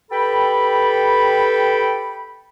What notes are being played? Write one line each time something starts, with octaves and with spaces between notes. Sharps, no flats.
G4 A4 B4 G5 B5